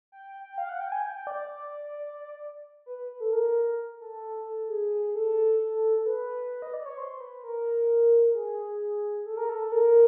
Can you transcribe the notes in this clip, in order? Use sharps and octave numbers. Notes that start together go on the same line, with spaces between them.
G5
G5
F5
F#5
G5
G#5
G5
D5
B4
B4
A4
A#4
A4
G#4
A4
B4
D#5
D5
C#5
C5
B4
A#4
G#4
A4
A#4
A4
A#4